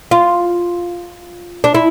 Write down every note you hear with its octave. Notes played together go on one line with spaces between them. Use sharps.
F4
D4
E4